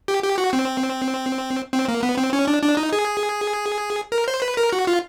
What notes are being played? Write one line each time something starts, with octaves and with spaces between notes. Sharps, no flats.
G4
G4
F#4
C4
C4
A#3
B3
C4
C#4
D4
D4
D#4
G#4
A#4
C5
B4
A#4
F#4
F4